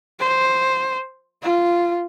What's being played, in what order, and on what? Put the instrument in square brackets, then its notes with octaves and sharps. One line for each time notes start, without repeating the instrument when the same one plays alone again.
[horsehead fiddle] C5
F4